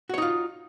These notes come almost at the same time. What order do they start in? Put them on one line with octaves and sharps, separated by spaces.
F#4 C#5 D#4 F4